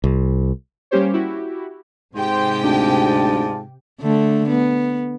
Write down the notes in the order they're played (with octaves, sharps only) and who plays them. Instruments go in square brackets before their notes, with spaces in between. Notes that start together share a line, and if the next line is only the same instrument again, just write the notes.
[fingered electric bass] C2
[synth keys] G3 A#3 C#4 G4 C5 C#5
E4 F#4 G4
[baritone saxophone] G#2 [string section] C3 G4 G5 [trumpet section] C5
[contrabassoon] D2 [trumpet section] F4 D5 A5
[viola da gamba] D3 A3
B3